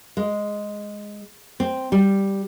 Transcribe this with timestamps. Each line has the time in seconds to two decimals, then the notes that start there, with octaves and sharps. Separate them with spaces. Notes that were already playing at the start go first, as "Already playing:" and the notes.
0.17 G#3
1.60 C4
1.92 G3